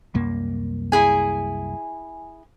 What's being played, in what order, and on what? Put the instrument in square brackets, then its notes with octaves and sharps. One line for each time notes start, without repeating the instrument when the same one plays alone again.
[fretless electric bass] C2 F#2 A#3
[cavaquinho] E4 G#4 G#5